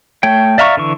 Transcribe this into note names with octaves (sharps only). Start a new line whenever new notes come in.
A3 C#5 G5
D5 E5 F5 A#5 C#6
D3 E3 C#6